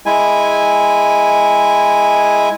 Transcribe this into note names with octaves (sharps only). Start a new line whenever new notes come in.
G#3 E4 G#5